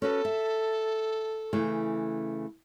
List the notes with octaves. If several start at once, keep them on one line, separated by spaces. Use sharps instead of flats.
C#4 F#4 A4 B4
E5
C#3 E3 A3